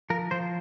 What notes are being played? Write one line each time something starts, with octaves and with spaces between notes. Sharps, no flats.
F3 A#4
F3 C5